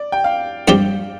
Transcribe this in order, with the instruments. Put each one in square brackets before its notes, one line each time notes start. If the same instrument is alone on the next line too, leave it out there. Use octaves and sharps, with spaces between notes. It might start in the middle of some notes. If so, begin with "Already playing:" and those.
Already playing: [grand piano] D5
G5
F5
[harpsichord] G2 G3 C4 G4